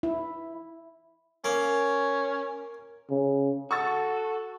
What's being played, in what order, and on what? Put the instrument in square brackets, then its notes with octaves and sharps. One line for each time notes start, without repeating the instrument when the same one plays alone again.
[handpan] E4
[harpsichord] A#3 [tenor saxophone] C#4
[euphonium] C#3
[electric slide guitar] F#4 [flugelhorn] A4 [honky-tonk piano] C#6 E6 A6